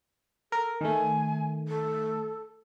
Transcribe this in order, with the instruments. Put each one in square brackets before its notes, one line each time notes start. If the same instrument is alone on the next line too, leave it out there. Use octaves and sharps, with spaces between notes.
[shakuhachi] A4 [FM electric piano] A#4
[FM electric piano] D#3 A3 [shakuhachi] G#5
[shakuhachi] A4